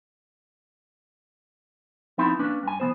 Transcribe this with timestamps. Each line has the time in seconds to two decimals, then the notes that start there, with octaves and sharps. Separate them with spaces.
2.18 F3 B3 C4 D#4 E4
2.39 A#3 C#4 D4 B4
2.63 G2 G#5
2.80 E3 F3 B3 C5